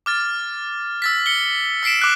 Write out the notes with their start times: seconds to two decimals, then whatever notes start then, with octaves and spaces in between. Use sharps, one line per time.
0.06 D6 F6 A6
1.02 E6 A6 B6
1.26 C#7 G7
1.83 E6 B6 C7 D7 E7
1.99 D6 F#6 E7